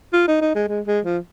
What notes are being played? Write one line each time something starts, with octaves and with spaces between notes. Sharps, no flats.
F4
D#4
D#4
G#3
G#3
G#3
F3